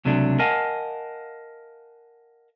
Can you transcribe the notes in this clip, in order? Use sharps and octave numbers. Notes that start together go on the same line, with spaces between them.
C#2 C3 F#3 A3 D4
A#4 D#5 F5 F#5 G#5 A5